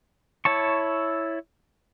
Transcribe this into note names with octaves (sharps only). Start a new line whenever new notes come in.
E4 C#5 A5 C#6